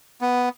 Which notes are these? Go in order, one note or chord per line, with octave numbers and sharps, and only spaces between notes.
B3